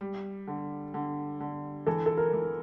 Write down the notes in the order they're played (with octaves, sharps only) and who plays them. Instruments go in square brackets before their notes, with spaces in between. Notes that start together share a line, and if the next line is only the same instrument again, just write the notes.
[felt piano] G3
D3
D3
D3
[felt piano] E3 [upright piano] A4
[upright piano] A4
A#4
[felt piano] E3